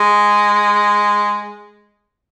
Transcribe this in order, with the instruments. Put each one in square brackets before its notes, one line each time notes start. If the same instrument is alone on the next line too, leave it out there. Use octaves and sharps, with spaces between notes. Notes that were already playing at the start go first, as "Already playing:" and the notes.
Already playing: [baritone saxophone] G#3